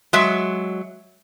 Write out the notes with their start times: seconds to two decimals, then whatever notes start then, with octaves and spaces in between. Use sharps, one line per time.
0.13 F#3 G#3 E5